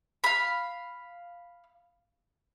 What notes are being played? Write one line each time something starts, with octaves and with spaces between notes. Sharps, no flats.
F5 B5